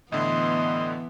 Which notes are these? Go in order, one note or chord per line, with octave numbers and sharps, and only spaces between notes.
A2 D3 E3 B3 E4 D#5 C6